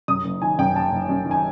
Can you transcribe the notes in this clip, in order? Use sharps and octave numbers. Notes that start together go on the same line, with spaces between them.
F#2 D#6
F#1
D#3 G#5
F#2 G5
F#1 A5
F#1
F#2
D#3
G#5